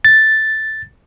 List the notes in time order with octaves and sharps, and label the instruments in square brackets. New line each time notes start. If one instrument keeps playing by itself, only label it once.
[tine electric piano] A6